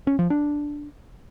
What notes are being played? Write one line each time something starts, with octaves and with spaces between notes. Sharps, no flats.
C#4
F3
D4